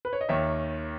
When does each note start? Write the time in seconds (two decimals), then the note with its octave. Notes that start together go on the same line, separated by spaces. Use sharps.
0.05 B4
0.13 C#5
0.21 D#5
0.29 D#2 D#3 C#5 E5